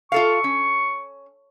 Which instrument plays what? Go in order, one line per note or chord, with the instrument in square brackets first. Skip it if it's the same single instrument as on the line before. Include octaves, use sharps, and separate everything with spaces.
[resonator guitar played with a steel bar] F4 A4 F5 [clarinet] C#6
[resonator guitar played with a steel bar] C#4